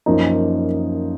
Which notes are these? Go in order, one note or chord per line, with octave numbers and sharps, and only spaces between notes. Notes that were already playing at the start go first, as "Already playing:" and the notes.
F#2 F3 A#3 D#4